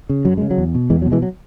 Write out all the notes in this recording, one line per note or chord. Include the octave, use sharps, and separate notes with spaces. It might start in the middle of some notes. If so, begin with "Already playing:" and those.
C#3
F#2 F#3
C#3 G#3
F#3
E2
B2
E2 E3 G#3
F#3
B2
E3 G#3
F#3